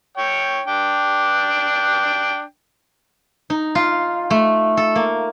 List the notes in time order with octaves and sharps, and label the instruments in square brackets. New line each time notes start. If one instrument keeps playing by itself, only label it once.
[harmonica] C#5 G5
D4 G5
[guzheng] D#4
F4
A3
A4
A#3